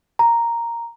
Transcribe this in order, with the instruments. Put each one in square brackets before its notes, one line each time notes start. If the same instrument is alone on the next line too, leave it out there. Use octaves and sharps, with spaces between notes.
[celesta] A#5